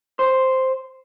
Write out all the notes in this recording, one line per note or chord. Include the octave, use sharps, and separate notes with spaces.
C5